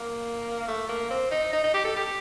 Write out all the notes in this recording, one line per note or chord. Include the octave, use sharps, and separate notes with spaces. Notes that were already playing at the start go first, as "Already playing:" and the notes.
Already playing: A#3
A3
A#3
C4
D#4
D#4
D#4
G4
A4
G4